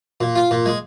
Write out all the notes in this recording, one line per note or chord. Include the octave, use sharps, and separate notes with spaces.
A#2
F4
A#2
G#3